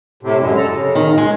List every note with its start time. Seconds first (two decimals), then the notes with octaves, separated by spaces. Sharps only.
0.23 A2 C3
0.40 F#2 D3 G#3
0.57 A4 A#5
0.71 C#3
0.95 D#3
1.18 G#3